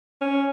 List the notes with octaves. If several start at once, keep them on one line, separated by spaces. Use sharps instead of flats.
C#4